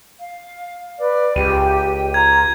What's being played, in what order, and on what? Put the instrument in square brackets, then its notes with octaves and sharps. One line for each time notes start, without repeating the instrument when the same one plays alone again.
[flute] F5
[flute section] B4 [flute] D5
[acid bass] C#2 [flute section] G4 [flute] G5 [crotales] D#7
[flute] F4 [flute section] A#5 [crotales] G#6